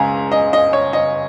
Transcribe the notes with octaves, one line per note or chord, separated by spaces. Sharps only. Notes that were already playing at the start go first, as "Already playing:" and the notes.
Already playing: C#2 C#3 G#3 G#5 A#5
D#5
D#5
C#5
D#5